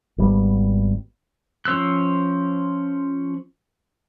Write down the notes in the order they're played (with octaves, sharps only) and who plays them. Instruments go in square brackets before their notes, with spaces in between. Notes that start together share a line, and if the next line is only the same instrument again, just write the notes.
[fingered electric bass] G#1 G3 B3
[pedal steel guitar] F3 C#4 C5 E6 F#6